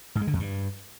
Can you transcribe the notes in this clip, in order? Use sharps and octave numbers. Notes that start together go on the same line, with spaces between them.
G#2
G#3
D3
F2
G2